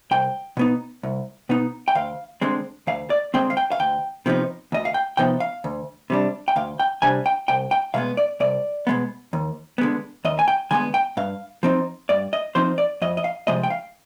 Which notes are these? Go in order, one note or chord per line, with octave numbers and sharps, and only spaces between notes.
C2 G5
B2 B3 D#4
C2
B2 B3 D#4
G5
D2 F5
D3 G#3 C4
D2 F5
D5
D3 G#3 C4 G5
F5
G5
F5
D2 G5
C3 F3 B3 D#4
D2 D#5
F5
G5
C3 F3 B3 D#4 G5
F5
D2
C3 G3 D4
G5
D2 F5
G5
C3 G3 D4 G#5
G5
C2 G5
G5
B2 G#3 B3 F5
D5
C2 D5
B2 G#3 B3
D#2
D3 G#3 B3
D#2 D#5
G#5
G5
D3 G#3 B3 G#5
G5
G2 F5
F3 C4 D#4
G2 D5
D#5
F3 C4 D#4 C5
D5
F2 D#5
D#5
F5
C3 F3 G#3 D#5
G5
F5